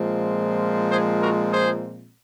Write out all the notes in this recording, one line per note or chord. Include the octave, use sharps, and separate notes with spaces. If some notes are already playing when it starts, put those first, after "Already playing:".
Already playing: A#2 F3 G#3 C4
G#4 C5
F#4 A#4
G#4 C5